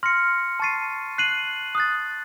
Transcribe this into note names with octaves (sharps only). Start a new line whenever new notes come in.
C6 F6 A#6 C#7
A5 C#6 A6 C7 D#7
F#6 C7 D#7 F#7
D#6 F#6 A6